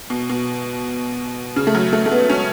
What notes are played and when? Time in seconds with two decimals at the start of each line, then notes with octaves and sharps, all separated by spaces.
0.10 B2
0.29 B2
1.56 C#3
1.67 A3
1.75 F#3
1.93 A3
2.06 A3
2.11 B3
2.30 C#4